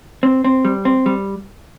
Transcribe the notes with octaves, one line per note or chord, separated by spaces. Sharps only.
C4
C4
G3
C4
G3